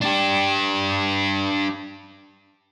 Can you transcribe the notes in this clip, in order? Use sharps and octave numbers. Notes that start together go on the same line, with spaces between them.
D4 G4